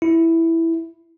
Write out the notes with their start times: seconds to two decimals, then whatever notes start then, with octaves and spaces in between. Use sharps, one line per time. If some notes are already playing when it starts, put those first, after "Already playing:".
0.02 E4